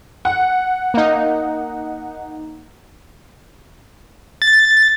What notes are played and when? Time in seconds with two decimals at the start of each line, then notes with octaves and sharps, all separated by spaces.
0.25 F#5
0.94 A#3 D#4
4.42 A6